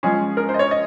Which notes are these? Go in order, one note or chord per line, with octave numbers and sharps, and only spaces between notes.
F3 G#3 C#4 G#4
A#4
C5
D#5
C#5
D#5